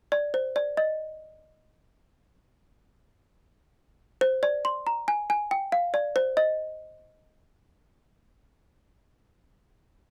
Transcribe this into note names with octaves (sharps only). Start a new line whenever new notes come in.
D5
C5
D5
D#5
C5
D5
C6
A#5
G#5
G#5
G5
F5
D5
C5
D#5